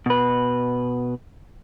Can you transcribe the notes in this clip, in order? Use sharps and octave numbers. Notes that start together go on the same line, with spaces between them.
B2 B4